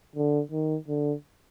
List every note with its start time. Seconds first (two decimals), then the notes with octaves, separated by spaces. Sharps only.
0.16 D3
0.51 D#3
0.88 D3